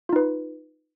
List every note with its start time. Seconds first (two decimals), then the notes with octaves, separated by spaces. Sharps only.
0.09 F4
0.13 D#4
0.16 B4